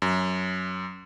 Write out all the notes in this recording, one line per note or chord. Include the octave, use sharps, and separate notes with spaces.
F#2